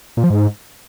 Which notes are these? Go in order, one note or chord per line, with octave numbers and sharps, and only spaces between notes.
A#2
F3
G#2